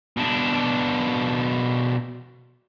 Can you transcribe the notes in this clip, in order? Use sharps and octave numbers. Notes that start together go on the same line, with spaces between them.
B2 D4